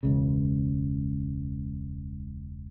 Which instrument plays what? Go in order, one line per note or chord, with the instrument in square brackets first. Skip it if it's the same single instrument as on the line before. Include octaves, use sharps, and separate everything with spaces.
[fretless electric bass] E1 C#2 C#3